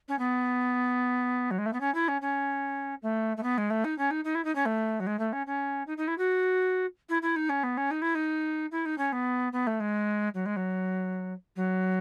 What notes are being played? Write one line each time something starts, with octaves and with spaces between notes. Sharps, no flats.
C#4
B3
F#3
G#3
A3
B3
C#4
E4
C#4
C#4
A3
A3
B3
G#3
A3
D#4
C#4
D#4
D#4
E4
D#4
C#4
A3
F#3
G#3
A3
C#4
C#4
D#4
D#4
E4
F#4
E4
E4
D#4
C#4
B3
C#4
D#4
E4
D#4
E4
D#4
C#4
B3
B3
A3
G#3
F#3
G#3
F#3
F#3